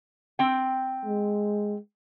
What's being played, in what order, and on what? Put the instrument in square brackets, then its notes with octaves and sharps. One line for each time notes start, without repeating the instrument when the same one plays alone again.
[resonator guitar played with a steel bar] C4 G5
[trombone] G#3